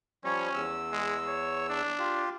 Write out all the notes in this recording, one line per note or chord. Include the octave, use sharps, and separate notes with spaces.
F3 G3 C#4 C#5
E2 E6
G#3
C#5
D4
F4 G4